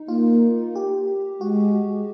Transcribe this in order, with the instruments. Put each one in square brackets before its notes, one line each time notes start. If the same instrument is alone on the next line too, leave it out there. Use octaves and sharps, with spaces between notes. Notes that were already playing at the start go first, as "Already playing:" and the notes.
Already playing: [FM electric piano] D#4
[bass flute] A#3 [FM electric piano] F4
[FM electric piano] G4
[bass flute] G#3 [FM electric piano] F#4